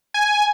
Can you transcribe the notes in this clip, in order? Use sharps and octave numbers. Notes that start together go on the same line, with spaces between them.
G#5